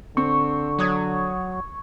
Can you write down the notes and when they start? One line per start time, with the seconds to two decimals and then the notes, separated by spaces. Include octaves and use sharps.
0.17 D3 C4 C#6
0.79 F#3 C#5 D#6 G#6